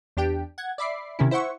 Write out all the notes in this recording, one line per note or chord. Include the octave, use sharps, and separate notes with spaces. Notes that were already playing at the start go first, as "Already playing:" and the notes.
E2 D4 G4 G5
F#5 G#6
D5 E5 B5 D6 C7
C3 D#3 C#4 E4
E4 C5 E5 F#5 C#6